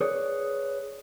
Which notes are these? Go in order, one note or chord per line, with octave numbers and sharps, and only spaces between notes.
G#4 B4 C#5 D5